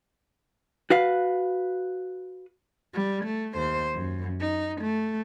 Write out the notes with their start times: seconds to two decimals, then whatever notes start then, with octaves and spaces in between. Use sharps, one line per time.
0.90 F#4 B4 F5
2.94 G3
3.25 A3
3.55 D#2 C5
3.94 F#2
4.41 D#4
4.82 A3